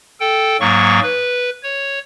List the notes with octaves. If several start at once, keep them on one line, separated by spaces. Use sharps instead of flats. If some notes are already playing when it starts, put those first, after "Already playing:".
A4 G5
G#2 F#3 A#3 C#6
B4
C#5